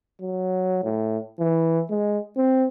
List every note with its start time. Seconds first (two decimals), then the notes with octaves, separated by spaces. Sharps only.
0.21 F#3
0.84 A2
1.39 E3
1.90 G#3
2.37 C4